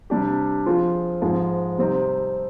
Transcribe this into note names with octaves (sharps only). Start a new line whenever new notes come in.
C3 G3 D4 G4
F3 C4 F4 G#4
G#2 F3 G#3
C3 G3 C4 D#4